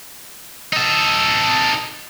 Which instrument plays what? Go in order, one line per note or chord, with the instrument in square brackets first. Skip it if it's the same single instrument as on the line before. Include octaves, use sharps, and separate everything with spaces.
[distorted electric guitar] D#4 A4